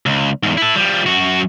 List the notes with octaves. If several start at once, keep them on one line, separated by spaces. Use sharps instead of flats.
C#2
E2 G#2
E4 A4
F3 G3
F#2 F#4